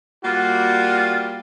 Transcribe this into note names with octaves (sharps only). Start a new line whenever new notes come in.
G3 A#3 F4 F#4